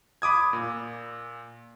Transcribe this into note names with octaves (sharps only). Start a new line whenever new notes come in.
B5 D6 D#6 G#6
A#2